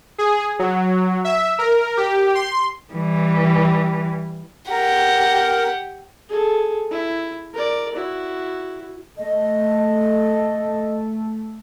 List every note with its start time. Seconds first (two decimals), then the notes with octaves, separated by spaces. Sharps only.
0.18 G#4
0.59 F#3
1.24 E5
1.59 A#4
1.97 G4
2.35 C6
2.93 E3 G3
4.70 G4 A#4 F#5
6.29 G#4 A4
6.91 E4
7.54 A#4 D5
7.95 E4 F#4
9.18 A3 D#5